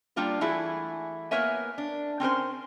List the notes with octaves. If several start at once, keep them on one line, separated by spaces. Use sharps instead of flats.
G3 A#3 D4 F4 A#4
E3 A3 E4 F#4 G#4
A#3 B3 A#4 C#5 E5 G#5
D4
C4 C#4 A#4 C5